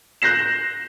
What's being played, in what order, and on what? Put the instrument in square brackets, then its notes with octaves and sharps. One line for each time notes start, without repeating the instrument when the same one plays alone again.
[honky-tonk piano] F#6 G6 A#6 C7 E7